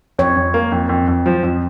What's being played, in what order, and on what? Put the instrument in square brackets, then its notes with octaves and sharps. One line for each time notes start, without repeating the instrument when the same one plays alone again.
[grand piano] F2 [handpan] C#5
[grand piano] F2
A#3
F2
F2
F2
F3
F2